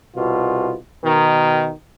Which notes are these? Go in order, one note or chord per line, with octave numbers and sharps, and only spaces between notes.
C2 B2 F4
B2 D#3